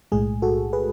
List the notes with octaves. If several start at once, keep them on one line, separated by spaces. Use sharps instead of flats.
B1 A2 G#3 G#4
F#4 A4
G#4 B4